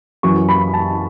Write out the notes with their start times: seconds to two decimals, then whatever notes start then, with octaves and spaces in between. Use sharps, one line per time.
0.23 F#2 E3 C#6
0.49 B5
0.74 A5